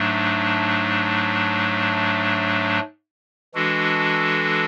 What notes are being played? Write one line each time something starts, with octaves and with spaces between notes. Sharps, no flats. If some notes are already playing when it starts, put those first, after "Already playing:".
Already playing: G#2 F#3 A3 D4
E3 G#3 D4 F#4 A4